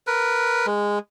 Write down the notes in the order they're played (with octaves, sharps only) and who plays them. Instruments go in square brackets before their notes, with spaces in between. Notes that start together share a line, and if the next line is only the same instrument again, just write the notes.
[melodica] A#4 B4
G#3